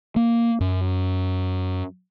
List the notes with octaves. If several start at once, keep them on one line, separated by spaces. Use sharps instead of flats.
A#3
F#2